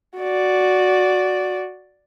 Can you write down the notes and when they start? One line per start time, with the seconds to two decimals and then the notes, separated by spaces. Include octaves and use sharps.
0.19 F#4 D5